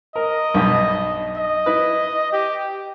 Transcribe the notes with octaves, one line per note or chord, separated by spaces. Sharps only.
A#4 D#5
B1 G2 B2
D#5
E4 B4
G4